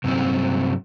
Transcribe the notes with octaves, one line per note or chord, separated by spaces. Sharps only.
G2 C3 F#3 G3 C4 C#4